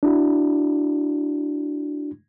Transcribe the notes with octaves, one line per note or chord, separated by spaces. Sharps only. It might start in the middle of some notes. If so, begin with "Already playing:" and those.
D4 E4 F#4